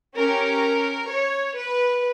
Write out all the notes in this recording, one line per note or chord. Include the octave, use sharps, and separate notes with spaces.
C#4 G4 A#4
C#5
B4